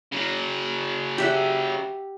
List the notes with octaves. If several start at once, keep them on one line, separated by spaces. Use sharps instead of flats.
C#3 F#3
G4 E5 F#5